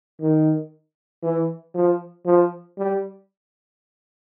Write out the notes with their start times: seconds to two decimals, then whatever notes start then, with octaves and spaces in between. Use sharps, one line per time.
0.21 D#3
1.23 E3
1.75 F3
2.26 F3
2.78 G3